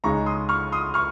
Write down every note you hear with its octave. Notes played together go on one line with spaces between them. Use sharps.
C#2 C#3 G#3 D#4 A#5 C#6
C6 D#6
C#6 F6
C6 D#6
C#6 F6